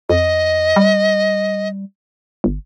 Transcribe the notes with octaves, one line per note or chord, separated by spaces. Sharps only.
F2 D#5
G3
G1